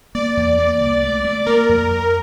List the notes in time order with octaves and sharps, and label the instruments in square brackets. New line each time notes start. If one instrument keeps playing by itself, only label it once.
[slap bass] A#3 [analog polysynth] D5
[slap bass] E2
A#3
C2
A3
A3
[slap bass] A#3 [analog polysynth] A#4
[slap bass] F2
F2